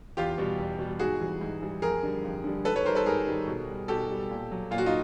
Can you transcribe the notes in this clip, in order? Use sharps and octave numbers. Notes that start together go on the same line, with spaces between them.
E2 F4 G4
B2 G3
E2
B2 G3
G#2 F#4 G#4
E3 G3
G#2
E3 G3
F2 G#4 A#4
D3 G3
F2
D3 G3
G#2 A4 B4
B4 C#5
D#3 G3 A#4 C5
A4 B4
G#2 G#4 A#4
D#3 G3
B2
G3
B2 G4 A4
G3
A#2
F#3
A#2 F4
F#4
D#4 F4